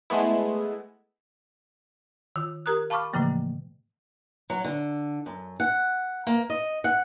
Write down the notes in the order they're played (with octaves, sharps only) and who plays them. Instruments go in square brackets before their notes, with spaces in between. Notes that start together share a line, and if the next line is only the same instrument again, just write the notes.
[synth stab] G#3 A3 B3 E4
[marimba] D#3 F4
G4 A#4 A#5 D#6 F#6
F5 A5 B5 C#6 D6 F6
A2 C#3 E3 F3 A3 A#3
[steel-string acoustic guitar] F#3
D3
F#2
F#5
A#3
D#5
F#5